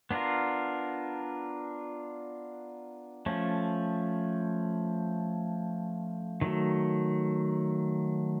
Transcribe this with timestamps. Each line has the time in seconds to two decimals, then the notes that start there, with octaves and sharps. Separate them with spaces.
0.11 B3 D4 F4 A#4
3.26 F3 A3 C#4
6.41 D#3 F#3 A3